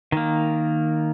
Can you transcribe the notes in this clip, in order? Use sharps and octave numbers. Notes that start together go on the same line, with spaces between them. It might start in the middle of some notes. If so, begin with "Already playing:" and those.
D#3 A#3